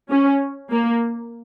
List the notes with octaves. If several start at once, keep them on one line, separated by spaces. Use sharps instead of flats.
C#4
A#3